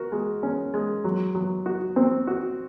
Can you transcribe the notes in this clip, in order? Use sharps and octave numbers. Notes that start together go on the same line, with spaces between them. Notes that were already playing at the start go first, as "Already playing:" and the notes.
Already playing: F#4 A#4
G#3
C#4
G#3
F#3
F#3
F#4
C4
F#4